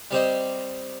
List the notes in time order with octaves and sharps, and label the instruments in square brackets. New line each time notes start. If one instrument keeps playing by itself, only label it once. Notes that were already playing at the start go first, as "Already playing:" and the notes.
[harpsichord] G3 C4 G4 C5 D#5